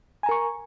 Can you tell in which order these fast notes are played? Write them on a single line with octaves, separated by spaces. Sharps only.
G#5 A#5 A#4 C#6